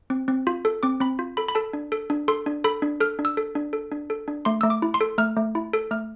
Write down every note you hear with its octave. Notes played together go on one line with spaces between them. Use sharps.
C4
C4
F4
A4
C4 D6
C4 B5
F4
A4 B5
B5
A4 A5
D4
A4
D4
A4 C6
D4
A4 B5
D4
A4 F6
D4
E6
A4
D4
A4
D4
A4
D4
A3 C6
A3 E6
D6
E4
C6
A4
A3 F6
A3
E4
A4
A3 F6